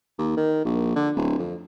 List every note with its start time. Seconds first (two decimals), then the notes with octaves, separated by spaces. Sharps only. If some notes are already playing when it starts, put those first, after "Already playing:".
0.18 D#2
0.37 D#3
0.65 A#1
0.96 D3
1.16 D1
1.39 F2